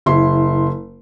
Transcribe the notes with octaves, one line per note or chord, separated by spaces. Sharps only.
F#1 E4 C6